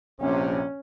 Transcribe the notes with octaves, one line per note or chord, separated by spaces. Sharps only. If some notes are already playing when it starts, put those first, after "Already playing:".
A#1 C3 C#4